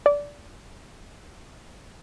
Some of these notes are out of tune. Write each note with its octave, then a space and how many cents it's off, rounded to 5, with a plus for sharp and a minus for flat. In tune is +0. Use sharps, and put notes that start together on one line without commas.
D5 -20